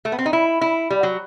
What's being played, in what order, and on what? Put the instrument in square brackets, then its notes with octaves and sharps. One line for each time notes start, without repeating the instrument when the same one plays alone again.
[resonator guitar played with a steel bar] A3
B3
C4
D#4
E4
E4
G3
F#3